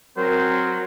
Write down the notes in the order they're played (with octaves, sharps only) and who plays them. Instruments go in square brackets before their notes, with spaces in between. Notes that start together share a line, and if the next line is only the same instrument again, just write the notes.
[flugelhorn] F#3 [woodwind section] C4 A#4 [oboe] C5